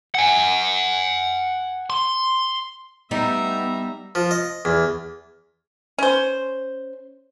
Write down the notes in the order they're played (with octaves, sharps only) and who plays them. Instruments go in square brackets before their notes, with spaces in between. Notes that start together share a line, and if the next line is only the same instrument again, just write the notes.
[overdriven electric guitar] F#5 G#5
C6
[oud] G3 D#4 [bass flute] B3 [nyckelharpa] E5 A#5
[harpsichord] F3
D#5
E2
[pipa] C#4 C5